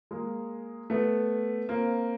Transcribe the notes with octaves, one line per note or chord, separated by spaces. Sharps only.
G#3 A#3
A3 B3
A#3 C4